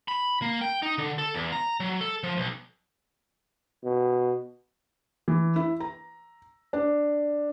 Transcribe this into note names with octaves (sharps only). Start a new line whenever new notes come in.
B5
A#3
G5
D#4
D3
A4
E2
A#5
F#3
A4
F3
B1
B2
E3
E4
A#5
D4